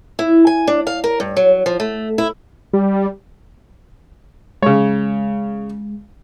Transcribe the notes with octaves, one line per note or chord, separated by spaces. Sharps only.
E4
G#5
D4
F5
A#4
G2
F#3
F3
A3
E4
G3
C#3 G#3 C#5